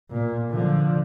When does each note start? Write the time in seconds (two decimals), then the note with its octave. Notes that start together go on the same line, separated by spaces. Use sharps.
0.11 A#2
0.51 D3 F3